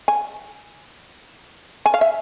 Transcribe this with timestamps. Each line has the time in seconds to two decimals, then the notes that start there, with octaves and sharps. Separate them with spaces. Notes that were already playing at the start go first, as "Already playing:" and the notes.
0.08 G#5
1.86 G#5
1.94 F5
2.01 E5